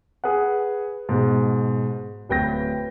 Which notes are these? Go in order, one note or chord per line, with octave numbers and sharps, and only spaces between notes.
G#4 B4 F#5
G#2 B2
D1 B4 G5 G6 A#6